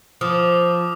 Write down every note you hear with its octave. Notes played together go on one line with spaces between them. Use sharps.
F3 D6 D#6 F6